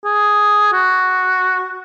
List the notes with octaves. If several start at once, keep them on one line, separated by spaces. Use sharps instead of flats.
G#4
F#4